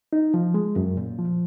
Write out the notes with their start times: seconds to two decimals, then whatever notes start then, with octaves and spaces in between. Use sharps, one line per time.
0.13 D#4
0.34 F3
0.54 G#3
0.76 F#2
0.97 A#2
1.19 F3